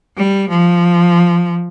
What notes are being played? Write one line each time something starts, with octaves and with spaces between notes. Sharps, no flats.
G3
F3